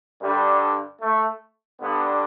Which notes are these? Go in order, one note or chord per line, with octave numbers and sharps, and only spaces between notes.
G2 D3 G3
A3
G2 D3 B3